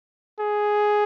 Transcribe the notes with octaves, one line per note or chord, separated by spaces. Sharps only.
G#4